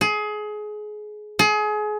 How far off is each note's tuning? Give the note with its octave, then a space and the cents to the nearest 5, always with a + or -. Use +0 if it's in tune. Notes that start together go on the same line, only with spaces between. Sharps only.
G#4 +25
G#4 +30